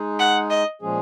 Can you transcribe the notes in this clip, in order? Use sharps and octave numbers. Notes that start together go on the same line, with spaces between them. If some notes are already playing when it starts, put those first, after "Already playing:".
Already playing: G#3 D#4 G#4
F#5
D#5
A#2 F3 G#3 C#4 G#4